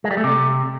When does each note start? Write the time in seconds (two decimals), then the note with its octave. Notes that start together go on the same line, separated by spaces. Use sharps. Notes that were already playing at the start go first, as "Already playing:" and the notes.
0.04 G#3
0.11 G3
0.17 A3
0.24 C3